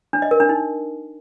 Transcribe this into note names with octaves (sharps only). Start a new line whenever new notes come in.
D4
D#5
A#4
D4
D#4